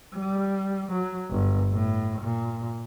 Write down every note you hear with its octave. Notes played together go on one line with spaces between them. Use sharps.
G3
F#3
G1
A2
A#2